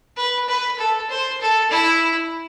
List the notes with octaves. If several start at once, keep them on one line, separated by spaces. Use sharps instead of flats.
B4
B4
A4
C5
A4
E4